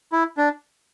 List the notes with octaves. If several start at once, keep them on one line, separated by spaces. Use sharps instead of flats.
E4
D4